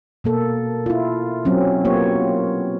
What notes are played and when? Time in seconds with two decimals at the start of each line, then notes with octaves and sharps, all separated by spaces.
0.24 B2 A#3 A4
0.86 E4 F4
1.45 F#3 C4 C#4
1.85 A#3 B3 F4 G4 C#5